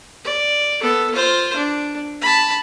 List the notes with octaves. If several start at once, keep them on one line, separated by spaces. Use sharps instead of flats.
D5
B3 A4
F4 C5
D4
A5 B5